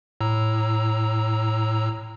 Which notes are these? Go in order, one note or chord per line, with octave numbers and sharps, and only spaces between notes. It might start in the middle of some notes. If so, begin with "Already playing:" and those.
A2 A#5 E6